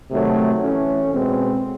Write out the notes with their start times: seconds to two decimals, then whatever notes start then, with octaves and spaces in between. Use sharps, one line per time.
0.11 C3 D#3 F#3 A3
0.61 A2 E3 A3 C#4
1.12 B2 G#3 B3 C4